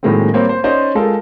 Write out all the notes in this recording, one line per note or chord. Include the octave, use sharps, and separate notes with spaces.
A2 D#3 F#3 G#3 A#3 C4
G3 A#3 C4 C5 C#5
C5
C#4 D#4 C5 D5 D#5
G#3 F4 A4 A#4